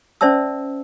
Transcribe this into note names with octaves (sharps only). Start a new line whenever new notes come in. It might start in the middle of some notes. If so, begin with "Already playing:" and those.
C#4 C5 D5 E5 A5 E6